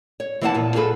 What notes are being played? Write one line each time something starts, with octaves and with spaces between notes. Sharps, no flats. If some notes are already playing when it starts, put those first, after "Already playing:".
C#5
E3 A#3 E4 C#5 F#5 A5
A#2 B3
F4 G#4 A4 B4